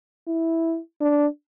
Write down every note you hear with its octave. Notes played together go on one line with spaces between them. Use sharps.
E4
D4